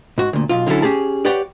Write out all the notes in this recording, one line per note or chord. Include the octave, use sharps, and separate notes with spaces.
G#2 F#4
D2 A#2
B1 F4
D3 F#3 C#4 E4 A4
C#4 G4 G#4 A5
G4 B4 C#5 D5 F#5 G5